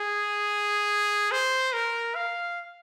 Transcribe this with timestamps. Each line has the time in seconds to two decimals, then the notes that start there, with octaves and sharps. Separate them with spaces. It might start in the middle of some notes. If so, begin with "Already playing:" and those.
Already playing: G#4
1.32 C5
1.73 A#4
2.15 F5